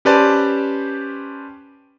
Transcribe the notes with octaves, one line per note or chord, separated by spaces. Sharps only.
C#4 G4 B4 C5 D5 A5